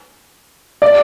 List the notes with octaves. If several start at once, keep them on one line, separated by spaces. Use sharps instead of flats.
D5